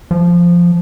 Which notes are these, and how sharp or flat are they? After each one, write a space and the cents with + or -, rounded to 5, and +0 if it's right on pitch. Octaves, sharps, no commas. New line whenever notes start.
F3 -5